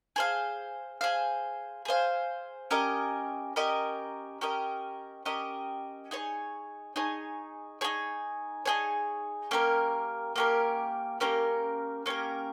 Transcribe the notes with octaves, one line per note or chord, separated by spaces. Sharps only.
G#4 C5 F5
G#4 C5 F5
G#4 C5 F5
C#4 G4 A#4 D#5
C#4 G4 A#4 D#5
C#4 G4 A#4 D#5
C#4 G4 A#4 D#5
D#4 G#4 C#5
D#4 G#4 C#5
D#4 G#4 C#5
D#4 G#4 C#5
A#3 C#4 G4 A#4
A#3 C#4 G4 A#4
A#3 C#4 G4 A#4
A#3 C#4 G4 A#4